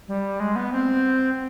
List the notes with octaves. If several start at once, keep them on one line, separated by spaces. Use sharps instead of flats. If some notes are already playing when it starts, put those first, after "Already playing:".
G3
G#3
B3
C4